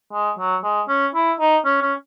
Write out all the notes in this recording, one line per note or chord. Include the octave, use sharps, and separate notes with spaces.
G#3
F#3
G#3
C#4
E4
D#4
C#4
C#4